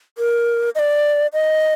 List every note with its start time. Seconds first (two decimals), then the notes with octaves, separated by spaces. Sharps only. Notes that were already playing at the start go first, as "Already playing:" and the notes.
0.18 A#4
0.75 D#5
0.79 D5
1.33 D#5